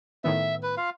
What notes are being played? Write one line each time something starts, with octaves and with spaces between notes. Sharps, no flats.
A2 D#3 B3 E5
B4
F4 F5